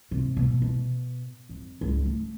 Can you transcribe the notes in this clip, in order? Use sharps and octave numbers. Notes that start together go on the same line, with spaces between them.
C3
B2
B2
F2
C#2
A3